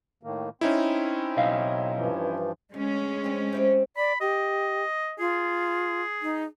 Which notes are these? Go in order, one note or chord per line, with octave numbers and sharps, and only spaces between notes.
A2 D#3 A#3
C4 C#4 D#4 E4
B1 D#5 F5
G2 E3 F3
D2 G#3 C#4
C4 D4
C4 E4 G4
D5 B5
G4 D#5
F4 G#4
D#4